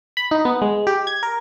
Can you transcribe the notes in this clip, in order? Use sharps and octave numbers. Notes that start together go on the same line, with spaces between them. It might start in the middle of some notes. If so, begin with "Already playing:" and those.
B5
D#4
B3
G#3
G4
G#6
A#4